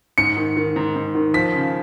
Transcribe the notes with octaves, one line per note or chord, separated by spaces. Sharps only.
G#2 C#7
D#3
D#3
G#2
G#2
D#3
F3 B6
C#3